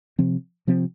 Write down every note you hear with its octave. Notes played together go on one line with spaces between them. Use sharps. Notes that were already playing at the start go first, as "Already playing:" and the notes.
C3 F3 C4
C3 F3 C4